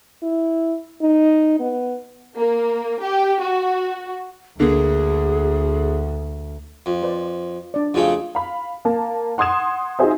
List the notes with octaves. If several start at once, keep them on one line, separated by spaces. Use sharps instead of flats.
E4
D#4
B3
A#3
G4
F#4
D2 D3 A#3 G#4
F2
B4 C5 D5
D4 D5
F2 C#3 A3 F#4 G#4
F5 B5
A#3 A5
F#5 C6 D#6 G#6 E7
D#4 F4 F#4 G#4 C5 E5